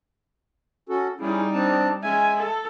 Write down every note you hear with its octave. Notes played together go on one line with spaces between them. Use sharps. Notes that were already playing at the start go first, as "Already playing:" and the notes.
C#4 F#4 A4
G3 C#4 D#4 E4 G#4
C4 D4 A5
G#3 C#4 E5 G#5
A4